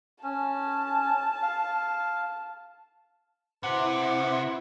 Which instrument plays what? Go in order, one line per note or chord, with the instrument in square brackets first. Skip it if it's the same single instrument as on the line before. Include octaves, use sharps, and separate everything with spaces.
[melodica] C#4 [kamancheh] A5
[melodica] F5
[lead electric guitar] C3 [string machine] E4 [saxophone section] B4 C5 F#5